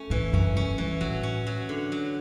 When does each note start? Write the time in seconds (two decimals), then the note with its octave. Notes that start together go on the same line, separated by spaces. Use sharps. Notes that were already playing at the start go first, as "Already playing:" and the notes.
Already playing: A3 C#4
0.10 A2 E3
0.33 F#2 C#4
0.56 F#2 C#4
0.78 G2 E3
1.01 A2 F#3
1.23 C#4
1.47 F#3
1.69 D3
1.92 F#3